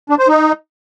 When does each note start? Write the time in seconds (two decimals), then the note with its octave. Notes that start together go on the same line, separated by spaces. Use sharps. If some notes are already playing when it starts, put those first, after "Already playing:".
0.09 D4
0.19 C5
0.28 D#4